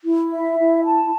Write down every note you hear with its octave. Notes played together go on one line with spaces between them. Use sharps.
E4
E5
E4
A5